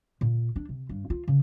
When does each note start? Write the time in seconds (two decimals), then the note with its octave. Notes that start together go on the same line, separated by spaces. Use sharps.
0.21 A#2
0.56 D4
0.69 C3
0.89 G2
1.10 F4
1.28 C#3